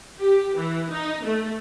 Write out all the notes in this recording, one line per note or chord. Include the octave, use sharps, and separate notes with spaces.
G4
E3
D#4
A3